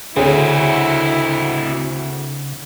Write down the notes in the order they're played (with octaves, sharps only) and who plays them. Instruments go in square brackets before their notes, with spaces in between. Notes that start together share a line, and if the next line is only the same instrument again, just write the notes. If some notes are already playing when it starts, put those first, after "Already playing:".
[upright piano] D2 G#4 C#5 [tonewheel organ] C#3 [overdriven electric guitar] C4 F#4 [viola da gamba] E4